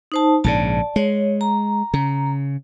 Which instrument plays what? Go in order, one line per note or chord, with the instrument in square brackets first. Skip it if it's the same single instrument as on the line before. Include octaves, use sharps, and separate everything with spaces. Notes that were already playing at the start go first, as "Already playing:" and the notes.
[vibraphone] D#4 C5 A5
[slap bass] A#1 G#2 C#3 [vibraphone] D5 A5
[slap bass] G#3 [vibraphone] C#5
[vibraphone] A#5
[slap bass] C#3